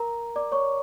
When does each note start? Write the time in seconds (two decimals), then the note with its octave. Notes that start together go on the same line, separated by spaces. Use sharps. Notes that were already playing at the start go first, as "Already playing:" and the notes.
Already playing: A#4 A#5
0.36 D5 D6
0.52 C#5 C#6